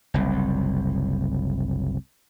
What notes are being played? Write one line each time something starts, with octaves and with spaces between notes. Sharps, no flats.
F#1 C2